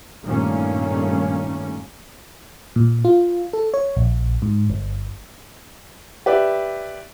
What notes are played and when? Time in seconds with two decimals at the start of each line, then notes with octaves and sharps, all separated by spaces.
0.23 G2 A#2 D#3 A3 A#3 C#4
2.76 A#2
3.05 F4
3.53 A4
3.74 C#5
3.96 A#1
4.42 G#2
4.70 G1
6.26 G4 B4 D5 E5